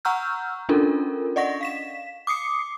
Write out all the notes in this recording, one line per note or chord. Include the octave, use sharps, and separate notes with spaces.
F#5 A#5 C#6 E6 F6 G6
C#4 D4 F4 A4 A#4
D5 D#5 F#5 C#6 A#6
F5 B6 E7
D6 D#6 C7 C#7